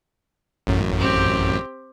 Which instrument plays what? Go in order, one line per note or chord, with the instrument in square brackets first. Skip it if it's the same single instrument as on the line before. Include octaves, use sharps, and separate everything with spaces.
[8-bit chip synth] A1 F#2
[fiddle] C4 G4